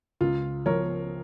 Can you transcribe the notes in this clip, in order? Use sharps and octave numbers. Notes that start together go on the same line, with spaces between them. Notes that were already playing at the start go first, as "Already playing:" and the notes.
C#2 F4
F3 A#4 C#5